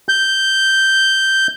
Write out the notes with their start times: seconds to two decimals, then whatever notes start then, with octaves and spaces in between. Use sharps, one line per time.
0.09 G6